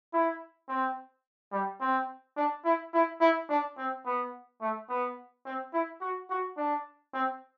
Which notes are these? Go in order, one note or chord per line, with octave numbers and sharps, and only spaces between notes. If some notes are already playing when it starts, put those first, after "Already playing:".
E4
C4
G3
C4
D4
E4
E4
E4
D4
C4
B3
A3
B3
C4
E4
F#4
F#4
D4
C4